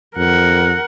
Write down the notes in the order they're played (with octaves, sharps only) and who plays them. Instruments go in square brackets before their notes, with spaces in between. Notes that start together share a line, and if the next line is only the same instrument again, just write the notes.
[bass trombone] F2 [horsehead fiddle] A#4 F#5